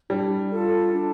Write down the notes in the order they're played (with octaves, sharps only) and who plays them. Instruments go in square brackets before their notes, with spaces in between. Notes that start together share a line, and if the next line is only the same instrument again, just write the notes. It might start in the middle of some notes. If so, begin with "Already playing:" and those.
[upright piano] G3 [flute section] D4
[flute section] F4 A4
D4